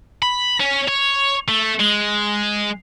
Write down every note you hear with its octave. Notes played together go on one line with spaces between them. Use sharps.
B5
C#4
C#5
A3
G#3